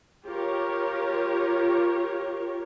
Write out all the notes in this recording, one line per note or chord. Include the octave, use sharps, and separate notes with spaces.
F4 G4 A#4 C#5